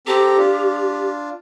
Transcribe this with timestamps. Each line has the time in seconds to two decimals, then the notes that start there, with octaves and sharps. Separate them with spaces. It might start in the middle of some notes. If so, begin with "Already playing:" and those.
0.07 C4 G4 A4 A#5
0.38 D4 F4